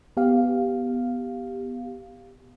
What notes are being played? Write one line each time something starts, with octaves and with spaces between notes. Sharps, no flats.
B3 G4 F5